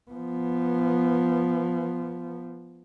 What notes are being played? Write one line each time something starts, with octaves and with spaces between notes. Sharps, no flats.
F3 B3